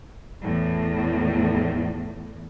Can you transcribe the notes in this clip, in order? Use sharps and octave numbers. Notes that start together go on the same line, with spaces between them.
E2 A2